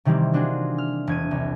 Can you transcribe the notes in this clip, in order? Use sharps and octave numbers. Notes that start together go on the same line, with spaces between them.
C3 D#3 E3 G3 A#3 C4
C4 D4 F4 F#4 G#4
F6
E1 G#6 D#7
C2